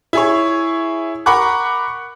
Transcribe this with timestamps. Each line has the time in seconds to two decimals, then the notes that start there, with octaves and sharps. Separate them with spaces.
0.13 E4 G#4 C#5
1.26 A#4 F#5 B5 C#6 D6 F#6